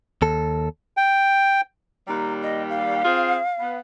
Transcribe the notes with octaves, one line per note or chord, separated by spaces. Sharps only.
D#2 A4
G5
D#2 G3 A#5
D#5
F5
C4 F4 G#4
B3